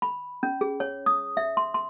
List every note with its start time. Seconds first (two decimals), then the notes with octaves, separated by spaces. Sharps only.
0.02 B5
0.43 C#4
0.61 G#4
0.80 C#5
1.06 D#6
1.37 E5
1.57 C6
1.74 C6